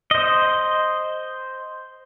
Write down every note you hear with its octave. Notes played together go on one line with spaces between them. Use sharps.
C5 D#5